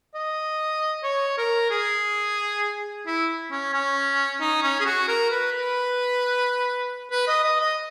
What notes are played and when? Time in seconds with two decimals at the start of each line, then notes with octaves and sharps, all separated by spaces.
0.14 D#5
1.03 C#5
1.38 A#4
1.70 G#4
3.06 E4
3.51 C#4
3.73 C#4
4.40 D#4
4.63 C#4
4.80 G#4
4.85 F#4
5.08 A#4
5.30 B4
5.52 B4
7.11 B4
7.28 D#5
7.44 D#5
7.60 D#5